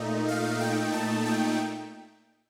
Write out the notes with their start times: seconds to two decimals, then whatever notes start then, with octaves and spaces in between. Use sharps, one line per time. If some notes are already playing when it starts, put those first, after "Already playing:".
Already playing: A#2 A3 D#4
0.28 F5
0.60 G5
0.93 A5
1.25 G5